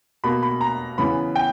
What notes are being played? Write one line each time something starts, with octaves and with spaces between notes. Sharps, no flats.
B2 A#3 B5
B5
A#5
C#3 E3 B3 B5
G5